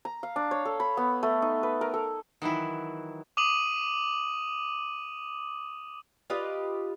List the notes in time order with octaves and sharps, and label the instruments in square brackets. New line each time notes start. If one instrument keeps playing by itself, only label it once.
[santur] A#5
F5
D4
C#5
A4
B5
B3
A3
D#4
B4
A#4
A4
[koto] D#3 E3 F#3 E4
[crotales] D6 D#6 D#7 F#7
[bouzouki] F4 G4 B4 D#5